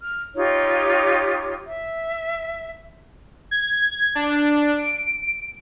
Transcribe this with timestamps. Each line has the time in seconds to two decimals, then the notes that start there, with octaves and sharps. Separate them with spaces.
0.03 F6
0.35 D#4 F4 G4 C#5
1.66 E5
3.51 G#6
4.15 D4
4.78 D7